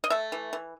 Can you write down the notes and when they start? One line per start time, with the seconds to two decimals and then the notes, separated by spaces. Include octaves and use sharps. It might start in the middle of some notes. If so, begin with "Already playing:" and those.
0.04 D#5
0.10 A3 E5
0.32 E3
0.53 E3